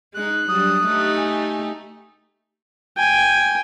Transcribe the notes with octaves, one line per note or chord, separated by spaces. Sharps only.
G#3 D#4 F#6
F#3 G3 D4 D#6
A3 D#4 G4
G#5
G5 G#5